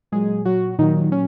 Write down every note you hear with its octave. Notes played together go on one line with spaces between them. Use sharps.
A#2 F#3 G#3 G#4
F#3 F#4
A#2 D#3 F#3 D#4
C#4